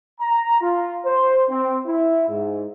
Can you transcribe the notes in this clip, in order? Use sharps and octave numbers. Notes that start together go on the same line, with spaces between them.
A#5
F4
C5
C4
E4
G#2